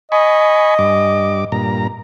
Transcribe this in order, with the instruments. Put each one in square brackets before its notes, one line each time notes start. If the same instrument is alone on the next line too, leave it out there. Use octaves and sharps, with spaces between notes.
[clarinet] D#5 [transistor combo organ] G#5 B5 C#6
[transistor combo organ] G2 D6
G2 A#2 A#5